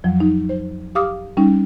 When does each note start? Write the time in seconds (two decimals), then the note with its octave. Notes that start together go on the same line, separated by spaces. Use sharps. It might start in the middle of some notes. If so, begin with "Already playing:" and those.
0.04 F2 F3 F#3
0.20 D#4
0.49 C5
0.95 G4 F5 D6 D#6 F6
1.37 G3 C#4 D#4